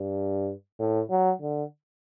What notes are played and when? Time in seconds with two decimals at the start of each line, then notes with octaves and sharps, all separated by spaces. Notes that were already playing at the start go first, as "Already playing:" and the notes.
Already playing: G2
0.79 A2
1.10 F#3
1.42 D3